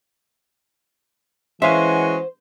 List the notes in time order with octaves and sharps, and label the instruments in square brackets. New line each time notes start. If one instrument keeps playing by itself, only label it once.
[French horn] E3 [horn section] G#3 C#4 F#4 [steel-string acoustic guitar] C5 [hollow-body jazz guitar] E5 F5